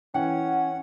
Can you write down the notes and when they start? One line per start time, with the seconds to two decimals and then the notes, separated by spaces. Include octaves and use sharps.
0.14 E3 C#4 F#5 G5